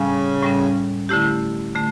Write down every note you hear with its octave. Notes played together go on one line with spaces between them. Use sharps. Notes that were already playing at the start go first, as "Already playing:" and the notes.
Already playing: A2 C#3 G3 C#4
A2 G3 C#4
D3 A3 E4 G4
D3 A3